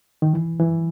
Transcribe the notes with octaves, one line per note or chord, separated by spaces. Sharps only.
D#3
E3
E3